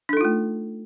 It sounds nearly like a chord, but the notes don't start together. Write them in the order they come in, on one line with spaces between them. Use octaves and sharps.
D4 A4 D#4 F4 A3